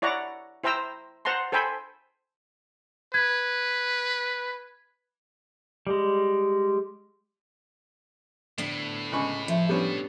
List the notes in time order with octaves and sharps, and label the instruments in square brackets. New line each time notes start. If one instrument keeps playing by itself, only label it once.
[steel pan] E4 C#5 D5 F#5 A#5
E4 C5 G5 A#5 E6
C5 F#5 A5 A#5 C6
A4 C5 G5 G#5 B5
[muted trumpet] B4 [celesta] G#6
[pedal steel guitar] G3 G#3
[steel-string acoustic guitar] D2 B3 D4 [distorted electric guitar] A2
[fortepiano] C#2 B5 C#6 [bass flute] C#4
[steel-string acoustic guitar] F3 [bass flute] E5
[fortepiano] G3 B3 C#4 [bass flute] D4